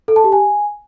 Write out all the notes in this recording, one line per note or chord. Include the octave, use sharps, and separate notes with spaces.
A4
A5
G4
G#5